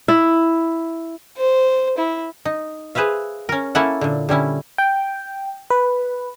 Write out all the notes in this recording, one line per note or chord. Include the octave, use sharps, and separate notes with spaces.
E4
C5
E4
D#4
G#4 B4 C5 E5 F5
C#4 A#4
A#3 C#4 E4 A4 F#5
A#2 D3
D3 G3 C#4 E4
G5
B4